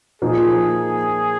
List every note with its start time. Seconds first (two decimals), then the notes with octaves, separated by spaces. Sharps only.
0.22 A#2 F3 A#3 D#4 G#4